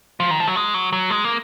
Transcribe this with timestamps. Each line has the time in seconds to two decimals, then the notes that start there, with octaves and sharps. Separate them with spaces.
0.20 F3
0.31 D#3
0.40 F3
0.48 F#3
0.56 G#3
0.74 F#3
0.93 F#3
1.10 G#3
1.24 A#3